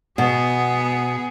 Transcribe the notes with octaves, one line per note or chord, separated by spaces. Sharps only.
B2 B3 G#4